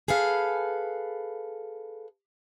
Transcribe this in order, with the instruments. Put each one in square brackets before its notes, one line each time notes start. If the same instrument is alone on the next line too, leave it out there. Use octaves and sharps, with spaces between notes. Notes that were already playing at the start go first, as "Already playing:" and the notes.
[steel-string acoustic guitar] G#4 A4 B4 F5